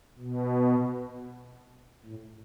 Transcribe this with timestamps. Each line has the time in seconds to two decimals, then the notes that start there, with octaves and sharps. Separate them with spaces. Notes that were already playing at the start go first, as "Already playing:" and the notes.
0.19 B2
2.06 A2